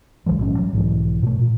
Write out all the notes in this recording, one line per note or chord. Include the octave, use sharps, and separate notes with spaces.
C2 D#3 F3 G#3
A#1 G#2 C#4
F#3 G3
B1 G#2 E3
B2 A3
A#2